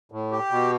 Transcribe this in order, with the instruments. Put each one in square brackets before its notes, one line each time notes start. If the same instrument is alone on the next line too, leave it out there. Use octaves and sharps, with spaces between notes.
[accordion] A2
G4
B2